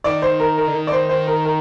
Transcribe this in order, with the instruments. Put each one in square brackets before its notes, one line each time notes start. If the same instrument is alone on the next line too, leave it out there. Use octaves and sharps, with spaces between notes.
[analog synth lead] D#3 [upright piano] D5
[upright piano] C5
A#4
A#4
[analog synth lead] D3
D#3
[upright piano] D5
[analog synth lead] D#3 [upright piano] C5
[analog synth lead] D#3 [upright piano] C5
[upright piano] A#4
A#4